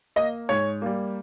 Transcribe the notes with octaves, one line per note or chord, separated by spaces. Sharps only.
A#3 D#5
G#2 C#5
G3 A#3